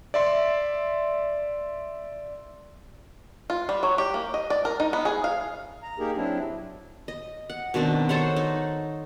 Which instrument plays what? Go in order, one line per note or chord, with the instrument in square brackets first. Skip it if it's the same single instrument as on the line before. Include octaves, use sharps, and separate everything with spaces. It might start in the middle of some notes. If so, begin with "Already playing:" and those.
[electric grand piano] D5 E5 C6
[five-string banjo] F4
G3
F#3
G4
A#3
D#5
D5
A#4
D#4
B3
G#4
F5
[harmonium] A#5
A#3 D#4 G4 G#4 A#4
F#3 C4 D4 E4
[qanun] D#5
F#5
B2 D#3 C4 D4
A4 C5 C#5 F#5
D#4